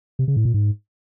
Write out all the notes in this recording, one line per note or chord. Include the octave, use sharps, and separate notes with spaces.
C3
C#3
A2
A#2
G#2